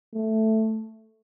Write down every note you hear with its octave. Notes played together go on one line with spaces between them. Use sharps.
A3